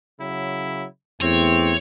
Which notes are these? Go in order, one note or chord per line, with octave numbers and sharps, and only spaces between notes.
C#3 F#3 E4
E2 A3 C4 C#5